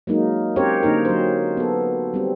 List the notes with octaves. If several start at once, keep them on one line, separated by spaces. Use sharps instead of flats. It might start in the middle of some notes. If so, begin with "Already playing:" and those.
F#3 G#3 A#3 D#4
C4 C#4 G4 A#4 C5 C#5
D3 A#3 D#4 A#4
F#3 C5
B3 A4
G3 C4